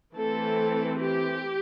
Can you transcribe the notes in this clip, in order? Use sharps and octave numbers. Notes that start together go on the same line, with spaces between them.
E3 A3 C4 A4
G4